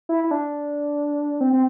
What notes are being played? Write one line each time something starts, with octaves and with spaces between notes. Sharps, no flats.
E4
E4
D4
C4
C4